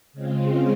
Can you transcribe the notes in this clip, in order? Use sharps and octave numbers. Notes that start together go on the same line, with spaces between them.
C#3 G#3 C4 F4